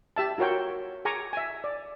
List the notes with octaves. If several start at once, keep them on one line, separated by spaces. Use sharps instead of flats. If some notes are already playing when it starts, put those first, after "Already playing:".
G4 E5 A5
F4 F#4 A#4 C#5 G5
G#4 G#5 A#5 C#6 D6
E5 G#5
D5